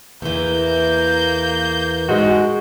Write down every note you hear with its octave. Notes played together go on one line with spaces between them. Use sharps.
E2 E3 A#3 G6
G#2 G#3 F#4